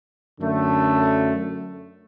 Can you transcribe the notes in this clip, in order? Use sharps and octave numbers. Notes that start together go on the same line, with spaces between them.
F#2 D3 A3